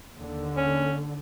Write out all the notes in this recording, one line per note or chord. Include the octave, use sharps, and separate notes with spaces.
D#2 D3
C#4